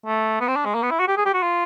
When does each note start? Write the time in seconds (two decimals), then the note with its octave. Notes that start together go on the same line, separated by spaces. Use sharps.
0.06 A3
0.40 B3
0.48 C4
0.56 D4
0.65 G#3
0.75 A#3
0.83 B3
0.91 E4
1.00 F#4
1.08 G4
1.17 G#4
1.26 G4
1.34 F#4
1.42 F4